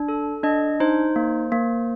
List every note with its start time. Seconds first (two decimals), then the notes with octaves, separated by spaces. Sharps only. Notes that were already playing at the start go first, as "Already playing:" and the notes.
Already playing: D4
0.08 A4
0.43 D4 D#5
0.80 D#4 C5
1.16 A#3
1.52 A#3